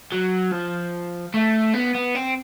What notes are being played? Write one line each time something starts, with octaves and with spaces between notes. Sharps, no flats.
F#3
F3
A3
B3
B3
C4